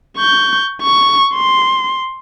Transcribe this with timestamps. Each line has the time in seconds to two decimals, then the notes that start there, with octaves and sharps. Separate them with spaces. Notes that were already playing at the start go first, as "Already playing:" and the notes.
0.17 C#6 G6
0.83 C#6
1.35 C6